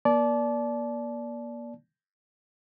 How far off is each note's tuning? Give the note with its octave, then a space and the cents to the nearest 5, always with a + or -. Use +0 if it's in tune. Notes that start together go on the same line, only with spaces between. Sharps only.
A#3 +35 D5 -10 A5 -30